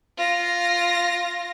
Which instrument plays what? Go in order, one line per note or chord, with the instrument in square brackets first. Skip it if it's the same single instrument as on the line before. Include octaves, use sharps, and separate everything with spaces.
[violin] F4 A#6